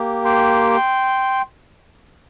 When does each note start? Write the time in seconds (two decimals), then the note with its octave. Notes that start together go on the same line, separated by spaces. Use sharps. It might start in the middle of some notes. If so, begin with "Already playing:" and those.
Already playing: A#3 G4
0.25 G5 C6